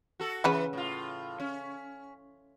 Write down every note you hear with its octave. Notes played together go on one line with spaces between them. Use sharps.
F#4 A4
C#3 E3 B4 F#5
A2 F4
C#4